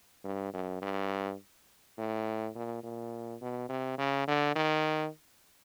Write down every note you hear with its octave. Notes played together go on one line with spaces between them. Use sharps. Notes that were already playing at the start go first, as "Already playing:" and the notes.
G2
F#2
G2
A2
A#2
A#2
B2
C3
C#3
D3
D#3